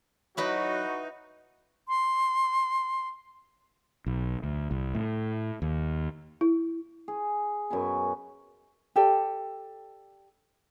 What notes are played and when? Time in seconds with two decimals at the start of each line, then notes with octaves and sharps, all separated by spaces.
0.37 F#3 D#4 E4 F#4 B4 D#5
1.88 C6
4.06 B1
4.44 D2
4.71 C2
4.95 A2
5.62 D#2
6.41 E4
7.08 G#4
7.70 F#2 B2 B4 G#5
8.96 G4 A4 D5